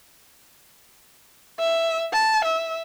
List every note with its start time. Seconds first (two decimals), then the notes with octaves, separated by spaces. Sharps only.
1.60 E5
2.13 A5
2.45 E5